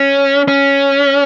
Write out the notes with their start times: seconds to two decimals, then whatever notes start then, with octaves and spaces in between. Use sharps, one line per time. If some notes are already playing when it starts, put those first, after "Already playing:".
Already playing: C#4
0.48 C#4